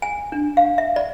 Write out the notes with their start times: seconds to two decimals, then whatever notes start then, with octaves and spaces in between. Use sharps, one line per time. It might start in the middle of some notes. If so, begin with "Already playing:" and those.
0.02 G#5
0.32 D4
0.57 F5
0.78 E5
0.96 D5